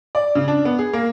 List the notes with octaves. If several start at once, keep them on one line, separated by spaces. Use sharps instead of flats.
D5
C#3
D4
B3
G#4
A#3